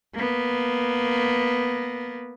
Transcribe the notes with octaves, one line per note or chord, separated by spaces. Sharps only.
A#3 B3